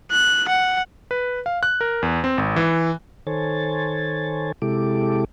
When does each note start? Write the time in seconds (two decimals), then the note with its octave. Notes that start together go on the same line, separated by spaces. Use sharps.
0.12 F#6
0.49 F#5
1.11 B4
1.46 F5
1.63 F#6
1.81 A#4
2.02 E2
2.24 C4
2.38 G#1
2.56 E3
3.27 D#3 A4 C5 C#5 G#5 A6
4.62 C3 G#3 E4 G4 A4 D6